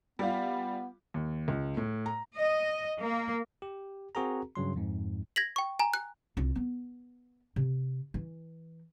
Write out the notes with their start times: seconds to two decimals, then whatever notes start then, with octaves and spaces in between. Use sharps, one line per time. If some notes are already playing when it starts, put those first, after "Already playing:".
0.19 G3 B3 F4
1.14 D#2
1.48 C#2
1.77 A2
2.06 A#5
2.39 D#5
3.01 A#3
3.62 G4
4.15 C4 F#4 G#4 A#4 A#5
4.55 G2 C#3 F#3 C6
4.76 F2 G#2
5.36 G#6 A#6 B6 F#7
5.56 G5 C#6
5.79 G#5 A#5
5.94 F#6
6.37 C2 F4
6.56 B3
7.56 C3
8.14 E3